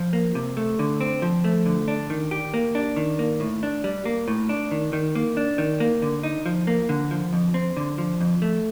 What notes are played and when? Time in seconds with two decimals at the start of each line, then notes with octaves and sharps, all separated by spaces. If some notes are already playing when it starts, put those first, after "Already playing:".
Already playing: F3
0.13 A#3
0.35 C3
0.57 A3
0.79 D3
1.01 C4
1.22 F3
1.44 A3
1.66 D3
1.88 D4
2.10 D#3
2.31 G4
2.54 A#3
2.75 D4
2.96 D#3
3.19 A#3
3.40 A2
3.63 D4
3.84 G3
4.05 A#3
4.28 A2
4.49 D4
4.71 D#3
4.93 D#3
5.15 A#3
5.37 D4
5.58 D#3
5.80 A#3
6.02 D3
6.23 D#4
6.46 F3
6.67 A#3
6.89 D3
7.11 F3
7.33 F2
7.54 C4
7.77 D3
7.98 F3
8.21 F2
8.42 A3